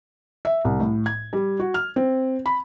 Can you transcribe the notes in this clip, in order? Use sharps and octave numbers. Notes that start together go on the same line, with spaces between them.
E5
C2
A2
G#6
G3
F#4
F6
C4
B5